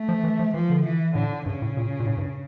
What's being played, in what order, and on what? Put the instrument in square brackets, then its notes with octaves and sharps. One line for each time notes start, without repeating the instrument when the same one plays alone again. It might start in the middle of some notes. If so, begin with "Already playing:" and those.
Already playing: [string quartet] A3
[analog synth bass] F3
E3
F3
[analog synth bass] E3 [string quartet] F3
[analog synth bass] D3
[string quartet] E3
[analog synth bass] A2 [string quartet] D3
[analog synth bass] G2 [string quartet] C#3
[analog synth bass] A2
A#2
A#2
A2
G2